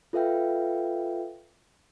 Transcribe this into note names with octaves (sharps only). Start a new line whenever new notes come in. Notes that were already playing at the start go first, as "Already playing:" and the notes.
F4 A4 B4 E5 F5 G5